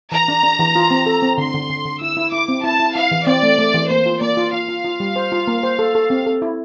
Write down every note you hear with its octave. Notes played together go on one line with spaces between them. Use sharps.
E3 A#5
D4
D4
E3
F4
C4
A4
C4
D3 C6
D3
D3
D3
E4 E6
E4
E4 D6
C4
E4 A5
E4
E4 F5
E3
C4 D5
A3
A3
E3
A#3 C5
F4
A#3 D5
F4
F4 F5
F4
F4
G3
C5
F4
A#3
C5
A4
A4
C4
A4
E4